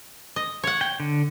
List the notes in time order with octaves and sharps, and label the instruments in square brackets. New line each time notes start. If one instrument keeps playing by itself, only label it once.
[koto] D#5
C#5 F#5
[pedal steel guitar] G5
D3